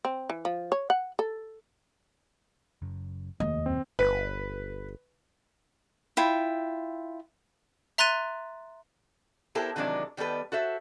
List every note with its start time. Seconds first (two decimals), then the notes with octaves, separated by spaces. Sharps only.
0.05 C4
0.30 E3
0.45 F3
0.72 C#5
0.90 F#5
1.19 A4
2.82 F#1 F#2
3.40 F1 D#2 A3 D#5
3.66 F#2 A#2 C4
3.99 G1 B4
6.17 E4 F4 G5
7.98 E5 A#5 C6 F#6 A6 D#7
9.55 B3 E4 G4 A4 A#4 C5
9.76 C3 D#3 E3 F#3 G#3 D4
10.17 D#3 G3 B3 A4 B4
10.52 F#4 A4 C5 E5